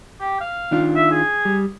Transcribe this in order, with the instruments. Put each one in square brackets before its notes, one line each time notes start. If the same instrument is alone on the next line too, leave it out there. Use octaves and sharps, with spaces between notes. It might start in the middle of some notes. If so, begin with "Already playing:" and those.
[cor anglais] G4
F5
[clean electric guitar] D#3 D4 F4
[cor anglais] E5
G#4
[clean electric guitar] G3